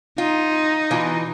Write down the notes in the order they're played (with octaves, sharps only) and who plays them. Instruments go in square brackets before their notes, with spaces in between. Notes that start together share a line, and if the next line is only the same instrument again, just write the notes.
[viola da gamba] D#4 [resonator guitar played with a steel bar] F4
[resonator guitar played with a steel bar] B2 E3 F4